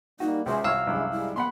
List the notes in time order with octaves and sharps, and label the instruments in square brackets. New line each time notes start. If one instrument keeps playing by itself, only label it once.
[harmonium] G3 A#3 [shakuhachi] D#4 [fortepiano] F#4
[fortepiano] C#2 [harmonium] F#4 G#4 C5 [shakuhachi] E5
[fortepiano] C2 C#5 [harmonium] F#4 [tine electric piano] F5 E6
[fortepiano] C2 F#2 [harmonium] G#3 D4 E4 [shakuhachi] E5
[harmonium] G3 G#3 [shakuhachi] E4
[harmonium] A#3 [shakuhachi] B3 [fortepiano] F#5 B5 C6